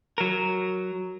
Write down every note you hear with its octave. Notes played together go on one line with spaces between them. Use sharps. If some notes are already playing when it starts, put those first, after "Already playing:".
F#3 A#4